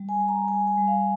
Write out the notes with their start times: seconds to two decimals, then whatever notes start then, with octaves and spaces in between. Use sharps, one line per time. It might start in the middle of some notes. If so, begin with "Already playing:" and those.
Already playing: G3
0.09 G#5
0.19 G3
0.28 A#5
0.48 G3 G#5
0.67 G#5
0.78 G3
0.88 F5